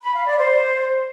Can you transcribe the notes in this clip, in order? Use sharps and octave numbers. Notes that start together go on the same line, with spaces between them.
B5
F5
D5
C5